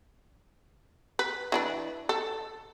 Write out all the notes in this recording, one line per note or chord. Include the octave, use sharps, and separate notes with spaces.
B4
E3 D4 B4
A4